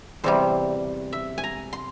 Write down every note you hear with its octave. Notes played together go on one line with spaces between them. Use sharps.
E2 C3 G3 C5
E5
G#5
A#5
C6